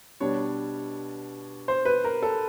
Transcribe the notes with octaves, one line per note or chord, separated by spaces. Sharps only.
B2 G3 B3 D4 C#5
C5
B4
A#4
A4